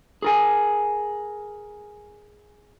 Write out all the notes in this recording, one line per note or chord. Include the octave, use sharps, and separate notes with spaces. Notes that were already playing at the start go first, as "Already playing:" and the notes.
G#4 A#4 G#5